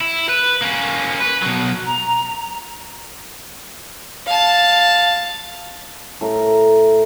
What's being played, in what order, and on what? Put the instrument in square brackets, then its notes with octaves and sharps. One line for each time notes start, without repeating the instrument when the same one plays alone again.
[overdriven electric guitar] E4
B4
A#3 C#4
B4
B2 F#3
[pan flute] A#5
[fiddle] F5 A5
[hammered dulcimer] A2 A#4